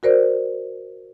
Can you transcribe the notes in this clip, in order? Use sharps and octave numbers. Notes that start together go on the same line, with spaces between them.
F#4 A#4 C5 D5